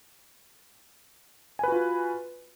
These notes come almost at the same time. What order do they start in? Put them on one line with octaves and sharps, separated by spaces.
G#5 B4 F#4 F4